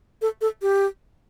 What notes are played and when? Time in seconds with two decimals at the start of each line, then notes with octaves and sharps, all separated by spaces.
0.22 A4
0.41 A4
0.62 G4